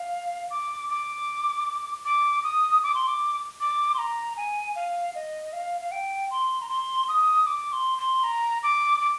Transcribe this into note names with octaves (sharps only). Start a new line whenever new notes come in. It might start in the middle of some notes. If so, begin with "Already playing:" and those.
Already playing: F5
D6
D6
D6
D#6
D6
C6
D6
D6
C6
A#5
G#5
F5
D#5
F5
F5
G5
C6
A#5
C6
D#6
D6
C6
C6
A#5
D6
D6